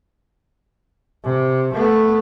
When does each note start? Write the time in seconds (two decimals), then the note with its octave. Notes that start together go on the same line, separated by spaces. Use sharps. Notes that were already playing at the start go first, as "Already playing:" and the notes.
1.24 C3
1.73 A3 B3